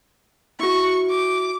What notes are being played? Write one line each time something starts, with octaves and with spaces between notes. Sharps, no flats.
E4 F#4 C#6
D6